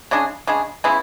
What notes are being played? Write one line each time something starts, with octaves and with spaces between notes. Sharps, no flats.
C#3 G#3 D4 G#4
C#3 G#3 D4 G#4
C#3 G#3 B3 E4